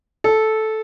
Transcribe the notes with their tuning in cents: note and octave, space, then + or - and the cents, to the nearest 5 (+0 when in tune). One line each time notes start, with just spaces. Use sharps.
A4 -10